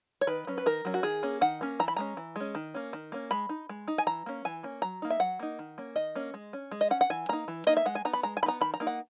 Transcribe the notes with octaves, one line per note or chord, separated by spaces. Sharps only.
C#5
D#3 B4
F#3 C#4
B4
D#3 A#4
F#3 C#4
F#4
D#3 G#4
A#3 C#4
D#3 F#5
A#3 C#4
E3 A#5
B5
G#3 C#4 A#5
E3
G#3 C#4
D#3
A#3 C#4
D#3
A#3 C#4
G#3 B5
D#4
G#3
D#4
G#5
E3 A#5
A#3 C#4
E3 G#5
A#3 C#4
F#3 A#5
A#3 D#4
E5
F#3 F#5
A#3 D#4
D#3
A#3 C#4
D#3 D#5
A#3 C#4
G#3
C#4
G#3
D#5
C#4 F#5
F#5
E3 G#5
A#3 D#4 A#5
E3
A#3 D#4 D#5
E5
G#3 F#5
G#5
B3 D#4 A#5
B5
G#3 A#5
G#5
B3 D#4 A#5 B5
D#3 B5
A#5
A#3 D#4
F#5